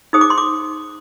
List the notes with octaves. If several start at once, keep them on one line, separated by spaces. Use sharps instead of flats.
D#4 G#4 C5 D#6
D6
C6
D6